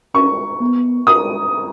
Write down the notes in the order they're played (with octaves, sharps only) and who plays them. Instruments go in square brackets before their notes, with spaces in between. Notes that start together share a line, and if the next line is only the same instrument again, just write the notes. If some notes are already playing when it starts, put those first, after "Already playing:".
[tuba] C#4 [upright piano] C#6
[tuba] B3
[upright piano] D#6